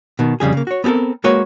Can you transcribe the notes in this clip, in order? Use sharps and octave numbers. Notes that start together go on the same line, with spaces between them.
B2 D#3
F2 C#3 G3 G#4
C#3 A#3
F#4 C#5
B3 C4 G4 A4 A#4
G#3 A#3 F#4 B4 C#5